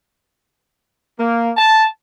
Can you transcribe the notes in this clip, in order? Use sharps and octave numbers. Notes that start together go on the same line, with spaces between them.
A#3
A5